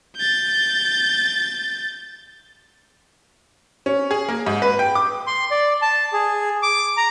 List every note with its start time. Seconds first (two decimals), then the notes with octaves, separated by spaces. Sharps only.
0.17 G6 A6
3.86 C#4
4.11 G#4
4.29 A#3
4.46 G#2
4.62 B4
4.79 G5
4.95 D6
5.27 C6
5.51 D5
5.82 A5
6.13 G#4
6.62 D6
6.97 A#5